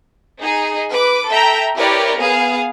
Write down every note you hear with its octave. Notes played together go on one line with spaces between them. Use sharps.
D#4 G#4
B4 D6
A4 E5 G5 A#5
E4 G4 A#4 B4 C#5 D5
B3 G#4 F5